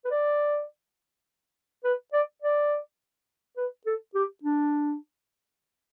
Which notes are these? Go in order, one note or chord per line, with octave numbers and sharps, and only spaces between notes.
B4
D5
B4
D5
D5
B4
A4
G4
D4